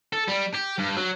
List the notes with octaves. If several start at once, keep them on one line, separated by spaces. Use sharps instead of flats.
A4
G3
G4
G2
F#3